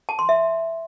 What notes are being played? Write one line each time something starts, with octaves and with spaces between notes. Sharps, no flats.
A5
C6
E5